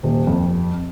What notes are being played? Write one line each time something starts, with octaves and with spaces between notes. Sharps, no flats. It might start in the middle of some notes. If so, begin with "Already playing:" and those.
D#1
F2